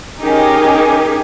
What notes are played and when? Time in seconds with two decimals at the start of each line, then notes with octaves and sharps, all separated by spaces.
0.22 C#4 D#4 G4 G#4 A#4 G#5